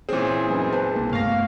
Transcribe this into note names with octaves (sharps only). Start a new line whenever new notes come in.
A#2 E3 C4 C#4 G#4
F#2 B3 D#4
B4 C5 A5
C2 A#3
G2 A3 B3 F5 C#6 A#6